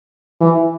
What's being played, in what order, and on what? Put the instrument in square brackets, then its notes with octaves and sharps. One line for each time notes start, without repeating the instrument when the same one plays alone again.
[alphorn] E3